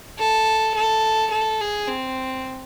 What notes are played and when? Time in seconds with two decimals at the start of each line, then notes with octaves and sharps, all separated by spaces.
0.19 A4
0.75 A4
1.32 A4
1.60 G#4
1.88 C4